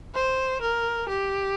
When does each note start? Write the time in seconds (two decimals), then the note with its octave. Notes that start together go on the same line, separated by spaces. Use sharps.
0.14 C5
0.61 A#4
1.08 G4